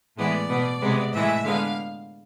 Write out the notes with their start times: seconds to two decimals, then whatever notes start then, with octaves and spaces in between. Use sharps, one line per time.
0.16 A2 E3 G#3 B3 D5
0.48 B2 B3
0.81 C3 G#3 B3
1.12 A2 E3 G#3 E5
1.43 D3 G#3 B3 F5